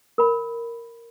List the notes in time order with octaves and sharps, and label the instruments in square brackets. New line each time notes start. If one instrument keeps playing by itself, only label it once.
[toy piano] A#4 B5